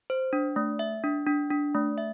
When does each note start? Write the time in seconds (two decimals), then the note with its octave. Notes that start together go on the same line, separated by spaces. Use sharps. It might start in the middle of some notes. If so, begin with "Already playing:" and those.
0.10 C5
0.33 D4
0.56 A3
0.79 E5
1.04 D4
1.26 D4
1.50 D4
1.75 A3
1.98 E5